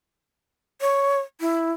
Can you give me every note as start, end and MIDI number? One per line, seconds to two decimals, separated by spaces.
0.81 1.19 73
1.40 1.71 64